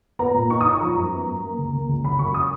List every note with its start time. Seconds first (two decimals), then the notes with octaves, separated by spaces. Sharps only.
0.19 B3 A#5
0.34 A#2
0.50 D#4 C#6
0.61 D#6
0.65 D#4
0.70 C#6
0.81 F3 A#5
0.96 F#2
1.12 B3
1.27 F#2
1.43 A#3
1.58 C#2
1.73 A#3
1.88 C#2
2.04 F#1 B5
2.19 F#2 C#6
2.34 D#6